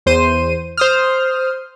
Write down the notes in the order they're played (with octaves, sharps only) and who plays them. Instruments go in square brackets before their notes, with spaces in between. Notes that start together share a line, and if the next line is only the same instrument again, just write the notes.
[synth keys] E2 C5 D#7
C5 D#6 F6